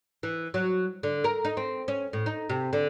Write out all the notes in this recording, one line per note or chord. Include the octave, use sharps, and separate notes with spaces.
E3
F#3
D3
A#4
D#4
C4
C#4
A2
D#4
C3
D3